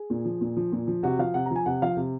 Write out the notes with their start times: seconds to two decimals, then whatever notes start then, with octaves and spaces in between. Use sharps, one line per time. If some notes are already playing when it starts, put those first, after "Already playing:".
Already playing: G#4
0.10 A#2
0.25 F3
0.41 A#2
0.57 F3
0.72 A#2
0.87 F3
1.03 C3 F#4
1.19 F3 F5
1.34 C3 F#5
1.46 A#5
1.51 F3 G#5
1.66 C3 F#5
1.82 F3 F5
1.97 C3